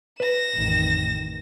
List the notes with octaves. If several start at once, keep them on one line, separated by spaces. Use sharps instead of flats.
B4 A#6 E7
A1 F2 D#3